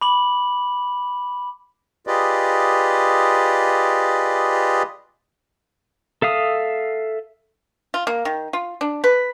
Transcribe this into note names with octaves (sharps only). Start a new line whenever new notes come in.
B5 D6 F#7
F4 G4 G#4 B4 D5 D#5
A4 E5 F5 D#6
F4
A#3
D#3
F4
D4
B4